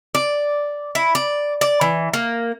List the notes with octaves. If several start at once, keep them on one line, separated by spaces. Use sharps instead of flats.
D5
E4
D5
D5
E3
A#3